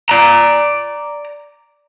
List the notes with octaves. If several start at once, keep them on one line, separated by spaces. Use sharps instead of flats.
D5 A#5